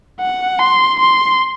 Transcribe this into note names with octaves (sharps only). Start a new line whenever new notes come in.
F#5
C6
C6